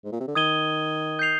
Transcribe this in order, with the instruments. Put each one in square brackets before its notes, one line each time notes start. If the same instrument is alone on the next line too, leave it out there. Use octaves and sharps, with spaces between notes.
[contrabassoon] G#2
A#2
C3
D3
[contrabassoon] D#3 [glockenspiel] D#6 G#6 D#7 G7
[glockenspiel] G6 C7 F7